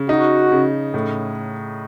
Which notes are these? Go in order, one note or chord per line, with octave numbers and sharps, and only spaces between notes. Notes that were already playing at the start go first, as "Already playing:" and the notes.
Already playing: C#3
D#4 F#4
C#3
A2